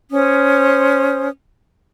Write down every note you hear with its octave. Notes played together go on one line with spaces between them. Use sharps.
C#4 C5 D#6